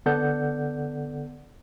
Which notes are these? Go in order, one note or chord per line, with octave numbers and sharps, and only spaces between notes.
D3 B3 A4 D5 F#5 G6